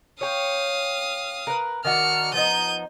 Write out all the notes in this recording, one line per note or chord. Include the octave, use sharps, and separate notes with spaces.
C#5 F5 G5 D#6
A#4 B4
D#3 D4 F#4 F6 C#7
F3 B3 D#4 G6 D#7